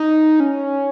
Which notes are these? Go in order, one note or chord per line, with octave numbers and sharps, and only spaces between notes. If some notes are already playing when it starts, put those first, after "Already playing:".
Already playing: D#4
C#4